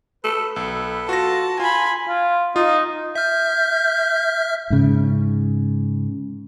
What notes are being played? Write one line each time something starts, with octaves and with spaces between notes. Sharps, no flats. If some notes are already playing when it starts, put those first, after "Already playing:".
A4 B4
B1 A4
F4 F#4 A5 A#6
F4 G#5 B5 C6
F4
D#4 F4
E5 F6 G6
G#2 C#3